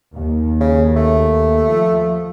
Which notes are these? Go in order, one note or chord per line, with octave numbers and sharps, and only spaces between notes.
D#2
C#3
A3
F3